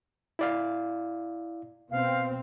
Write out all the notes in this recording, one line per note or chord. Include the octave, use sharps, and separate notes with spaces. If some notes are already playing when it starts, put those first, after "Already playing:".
E4 D5 F5
B2 C4 F5